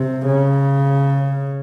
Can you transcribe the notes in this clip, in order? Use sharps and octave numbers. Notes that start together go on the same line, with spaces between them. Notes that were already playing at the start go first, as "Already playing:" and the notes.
Already playing: C3
C#3